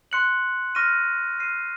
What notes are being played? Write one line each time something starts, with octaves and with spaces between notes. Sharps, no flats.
C6 F#6 C#7 F#7
C#6 F6 A#6 D#7
F6 C7 D#7